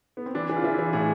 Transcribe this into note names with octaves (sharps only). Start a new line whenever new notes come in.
B3
C4
E3 D4
E3 G#4
F4
E3 E4
E3
A2 G#4